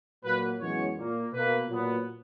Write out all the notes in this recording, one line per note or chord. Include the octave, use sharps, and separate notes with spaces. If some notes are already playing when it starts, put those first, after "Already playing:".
A#2 F#3 A#3 B4
F#2 E3 G#3 B3 C#5
A#2 A#3
B2 A#3 B4
A#2 F#3 B3